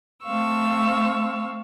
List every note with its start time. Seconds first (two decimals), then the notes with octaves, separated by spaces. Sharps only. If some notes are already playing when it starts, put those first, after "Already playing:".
0.24 A3 C4 F5 C#6 E6